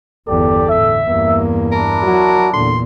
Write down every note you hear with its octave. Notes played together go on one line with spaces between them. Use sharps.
G1 E2 G4 A4 D5
A2 D3 E5
E2 G2 A#3
D4 E4 A#4 A5
F#3 F#4
E2 A#2 D3 C6